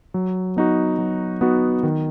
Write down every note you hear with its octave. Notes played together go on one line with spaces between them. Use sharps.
F#3
B3 D#4 F#4
F#3
B3 D#4 F#4
D#3